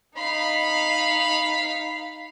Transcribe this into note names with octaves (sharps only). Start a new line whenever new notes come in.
D#4 F5 B5